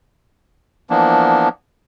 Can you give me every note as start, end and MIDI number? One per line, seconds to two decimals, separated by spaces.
0.90 1.49 52
0.90 1.49 53
0.90 1.49 58
0.90 1.49 59
0.90 1.49 62